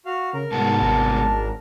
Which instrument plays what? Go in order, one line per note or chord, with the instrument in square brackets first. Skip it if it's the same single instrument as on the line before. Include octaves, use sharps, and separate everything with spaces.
[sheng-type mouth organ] F#4 F5
[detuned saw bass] C#3 [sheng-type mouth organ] A#4
[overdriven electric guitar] C2 B3 [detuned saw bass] G#2 [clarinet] A5
[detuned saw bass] G#1 [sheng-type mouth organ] D4 A#4